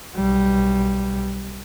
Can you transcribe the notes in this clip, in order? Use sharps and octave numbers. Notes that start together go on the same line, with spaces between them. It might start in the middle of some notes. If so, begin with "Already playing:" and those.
B1 G3